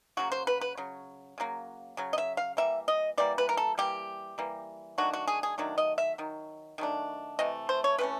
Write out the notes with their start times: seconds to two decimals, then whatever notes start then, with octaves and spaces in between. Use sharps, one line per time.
0.17 C#3 F#3 A#3 F#4
0.32 C5
0.47 B4
0.61 B4
0.77 C#3 F#3
1.38 C#3 F#3 A#3
1.97 C#3 F#3
2.13 D#5
2.18 E5
2.37 F5
2.57 E3 G3 A#3 E5
2.88 D#5
3.18 E3 G3 A#3 D5
3.38 B4
3.49 A#4
3.57 A4
3.78 E3 G3 A#3 G4
4.38 E3 G3 A#3
4.98 D#3 F#3 A3 D4 F#4
5.13 F#4
5.28 G#4
5.43 G#4
5.58 D#3 F#3 A3 D4
5.78 D#5
5.98 E5
6.18 D#3 F#3
6.78 D#3 F#3 A3 D4
7.39 C3 E3 A3 D#5
7.69 C5
7.84 C#5
7.98 C3 E3 A3 C#4 B4